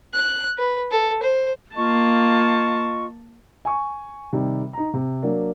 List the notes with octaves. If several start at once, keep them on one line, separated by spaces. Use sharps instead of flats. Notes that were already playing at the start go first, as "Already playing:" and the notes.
F#6
B4
A4
C5
A#3 F4 D#5 A5 C#6
G#5 C#6
C3 D#3 G3
D#4 A#5
C3
F#3 A#3 D4